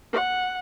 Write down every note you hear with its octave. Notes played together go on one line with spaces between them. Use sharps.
F#5